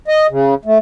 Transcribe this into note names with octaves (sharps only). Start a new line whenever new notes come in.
D#5
C#3
A3